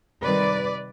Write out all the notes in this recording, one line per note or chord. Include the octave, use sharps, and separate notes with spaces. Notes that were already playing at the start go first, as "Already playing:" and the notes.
C3 D#3 G3 B4 D5